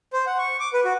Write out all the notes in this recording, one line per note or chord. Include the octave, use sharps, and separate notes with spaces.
C5
F#5
C#6
D6
B4
F#4